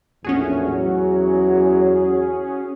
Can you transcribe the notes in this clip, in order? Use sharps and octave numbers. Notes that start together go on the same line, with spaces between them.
A#1 E2 A2 C#4 F#4 G#4
E2 F#3